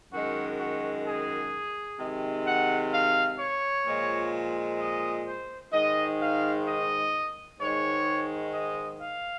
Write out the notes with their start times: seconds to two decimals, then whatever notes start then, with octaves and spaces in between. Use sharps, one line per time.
0.12 F#2 D#3 G#3 F#4
0.59 F#4
1.06 G#4
1.99 C3 D#3 G#3
2.46 F#5
2.93 F5
3.40 C#5
3.87 A#2 F3 G#3
4.80 D#5
5.27 C5
5.73 G#2 D#3 G#3 D#5
6.20 F5
6.67 D#5
7.60 G#2 D#3 G#3 C#5
8.54 D#5
9.01 F5